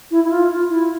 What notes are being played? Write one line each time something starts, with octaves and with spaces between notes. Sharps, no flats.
E4
E4
F4
F4
E4